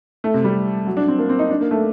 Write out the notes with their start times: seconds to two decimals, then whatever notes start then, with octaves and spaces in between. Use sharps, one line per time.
0.24 A3
0.34 C3
0.44 G3
0.87 F#3
0.97 D4
1.08 C4
1.19 A#3
1.29 C4
1.39 D#4
1.50 D4
1.61 A#3
1.71 A3